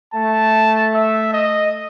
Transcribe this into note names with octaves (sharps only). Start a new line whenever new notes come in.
A3 A5
E5
D#5